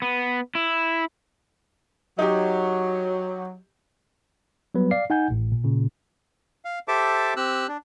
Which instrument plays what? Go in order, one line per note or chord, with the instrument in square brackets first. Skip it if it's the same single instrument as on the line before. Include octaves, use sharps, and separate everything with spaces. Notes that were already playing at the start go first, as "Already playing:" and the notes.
[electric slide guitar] B3
E4
[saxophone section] F#3 [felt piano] D#4 G4
[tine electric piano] F#3 G3 B3 B4
D5 F5 C7
D#4 F#5 G#5 G6
A1 A2
A#2
A#2 C#3
[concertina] F5
G4 A4 C5 E5 A5 D6
C4 G4 E6 F#6
D4